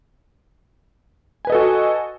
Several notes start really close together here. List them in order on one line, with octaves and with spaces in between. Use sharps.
G#5 B4 D#5 A4 F#4